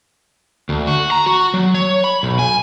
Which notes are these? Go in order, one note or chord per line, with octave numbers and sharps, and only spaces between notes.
D2
F#4
A#5
F#4
F#3
C#5
B5
B1
G#5